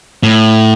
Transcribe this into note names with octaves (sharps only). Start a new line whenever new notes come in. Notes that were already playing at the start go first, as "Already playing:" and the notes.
A2